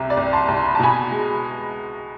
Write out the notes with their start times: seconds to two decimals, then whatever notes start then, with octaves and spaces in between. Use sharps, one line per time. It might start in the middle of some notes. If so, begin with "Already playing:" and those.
Already playing: C2 C3 E5
0.10 D5
0.17 C2
0.33 A5 C6
0.48 C2
0.56 C6
0.66 B5
0.75 A5
0.80 B2 G#5 B5
1.11 G#3